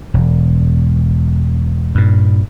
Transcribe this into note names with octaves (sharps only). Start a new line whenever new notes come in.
E1
G2 A#2